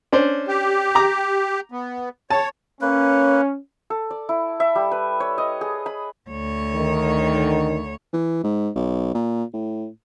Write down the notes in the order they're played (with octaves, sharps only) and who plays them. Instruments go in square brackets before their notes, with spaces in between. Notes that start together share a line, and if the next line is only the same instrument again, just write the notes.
[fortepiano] C#4 D4 C5
[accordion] G4
[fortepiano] A#5 D6
[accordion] B3
[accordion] C#5 [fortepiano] A5
[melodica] A#3 B4 [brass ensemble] C#4
[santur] A4
D5
E4
E5
G3
B4
C#5
D#5
G#4
B5
[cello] D2 C#5
[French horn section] D3 D#3
[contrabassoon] E3
G#2
B1
A#2
A2